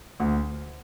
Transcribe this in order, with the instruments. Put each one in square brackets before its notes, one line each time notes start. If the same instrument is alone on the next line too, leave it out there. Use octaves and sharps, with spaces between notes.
[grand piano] D2